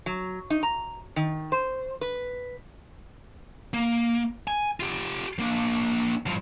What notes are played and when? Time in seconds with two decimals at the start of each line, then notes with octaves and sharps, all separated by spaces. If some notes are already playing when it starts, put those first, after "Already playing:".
0.06 F#3
0.50 D#4
0.63 A#5
1.16 D#3
1.52 C5
2.01 B4
3.74 A#3
4.47 G#5
4.80 F4 G4
5.39 A#3 D4
6.27 G2 F3